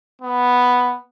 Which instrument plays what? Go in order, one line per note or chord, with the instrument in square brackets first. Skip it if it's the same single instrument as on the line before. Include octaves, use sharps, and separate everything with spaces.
[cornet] B3